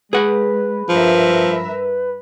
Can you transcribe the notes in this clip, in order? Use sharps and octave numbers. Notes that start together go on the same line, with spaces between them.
G#3 G#4 B4 F#5
G2 F3 A#4 E5